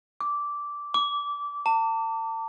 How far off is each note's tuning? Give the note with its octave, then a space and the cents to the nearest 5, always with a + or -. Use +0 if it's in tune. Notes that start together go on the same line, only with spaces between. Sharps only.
D6 -10
D6 -20
A5 +40